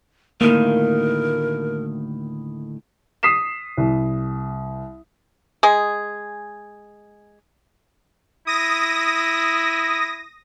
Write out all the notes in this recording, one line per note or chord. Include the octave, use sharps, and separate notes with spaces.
D2 A2 D#3 A#3 A#4
D#6 B6 C7 E7
C2
G#3 G#4
E4 D#6 A#6